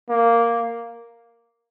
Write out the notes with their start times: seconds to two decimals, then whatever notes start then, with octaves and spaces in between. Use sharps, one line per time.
0.09 A#3